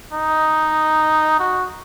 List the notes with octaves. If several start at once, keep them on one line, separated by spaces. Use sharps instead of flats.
D#4
F#4